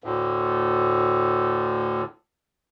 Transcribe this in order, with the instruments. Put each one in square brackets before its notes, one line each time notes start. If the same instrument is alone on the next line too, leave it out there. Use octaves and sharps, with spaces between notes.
[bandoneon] D2 A2